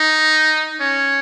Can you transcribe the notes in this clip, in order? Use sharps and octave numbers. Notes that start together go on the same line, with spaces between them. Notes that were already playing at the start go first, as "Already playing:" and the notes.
Already playing: D#4
C#4